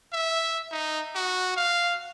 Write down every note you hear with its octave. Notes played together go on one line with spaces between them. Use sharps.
E5
D#4
F#4
F5